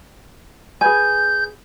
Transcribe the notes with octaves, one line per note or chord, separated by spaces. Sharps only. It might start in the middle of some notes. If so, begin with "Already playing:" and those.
G#4 B4 G#5 G6